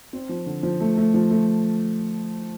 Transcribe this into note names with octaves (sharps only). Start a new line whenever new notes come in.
C4
F3
D3
F3
A3
A3
F3
A3